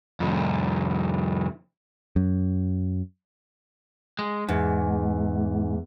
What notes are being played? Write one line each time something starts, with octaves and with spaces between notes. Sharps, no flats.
C2 F2
F#2
G#3
E2 G#2